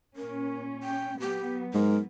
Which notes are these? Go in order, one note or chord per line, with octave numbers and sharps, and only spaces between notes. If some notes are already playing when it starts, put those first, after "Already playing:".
A#2 C#4 A#4
G5
F#3 B3 G4
G#2 A#4